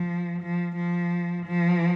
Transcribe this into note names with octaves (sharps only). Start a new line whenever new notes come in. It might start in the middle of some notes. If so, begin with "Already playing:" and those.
Already playing: F3
F3
F3
F3